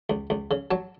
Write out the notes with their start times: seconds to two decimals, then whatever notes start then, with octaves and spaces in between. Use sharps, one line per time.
0.10 C#2
0.30 C#2
0.51 C#3
0.71 F#3 A5